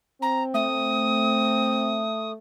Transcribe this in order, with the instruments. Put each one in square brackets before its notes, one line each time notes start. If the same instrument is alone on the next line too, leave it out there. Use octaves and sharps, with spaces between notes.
[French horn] C4 [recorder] A#5
[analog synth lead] A3 [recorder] D#6